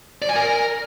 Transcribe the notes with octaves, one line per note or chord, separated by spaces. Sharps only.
D5
G#5
A#4